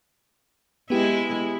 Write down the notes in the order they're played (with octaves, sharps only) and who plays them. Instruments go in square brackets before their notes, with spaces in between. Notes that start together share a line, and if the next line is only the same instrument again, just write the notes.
[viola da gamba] G#3 E4 [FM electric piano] B3 G4